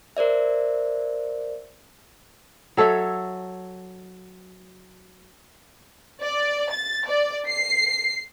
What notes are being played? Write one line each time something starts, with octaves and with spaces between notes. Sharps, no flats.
A#4 C5 D5 E5
F#3 A4 C#5 E5
D5
A6
D5
C7